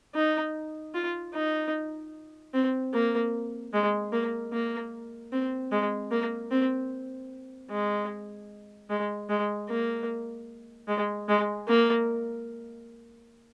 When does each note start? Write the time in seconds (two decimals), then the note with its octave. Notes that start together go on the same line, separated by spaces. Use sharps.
0.15 D#4
0.94 F4
1.34 D#4
2.54 C4
2.93 A#3
3.73 G#3
4.12 A#3
4.53 A#3
5.32 C4
5.72 G#3
6.11 A#3
6.51 C4
7.70 G#3
8.90 G#3
9.29 G#3
9.69 A#3
10.88 G#3
11.28 G#3
11.68 A#3